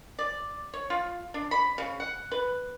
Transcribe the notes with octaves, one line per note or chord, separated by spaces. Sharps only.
D5
C#5
F4
D4
B5
C#3
F#5
B4